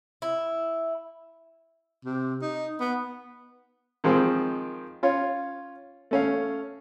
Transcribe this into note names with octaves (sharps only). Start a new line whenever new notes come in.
E4
C3
D#4
B3
D#3 F3 G#3 C4
C#4 F4 C#5
A3 C#4 F5